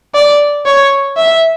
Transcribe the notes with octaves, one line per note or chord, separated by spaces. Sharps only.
D5
C#5
E5